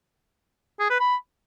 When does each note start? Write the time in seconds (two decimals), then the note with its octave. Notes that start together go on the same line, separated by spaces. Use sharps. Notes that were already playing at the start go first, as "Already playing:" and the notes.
0.80 G#4
0.90 B4
1.00 B5